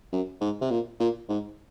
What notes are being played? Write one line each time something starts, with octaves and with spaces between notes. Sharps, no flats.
F#2
G#2
C3
A#2
A#2
G#2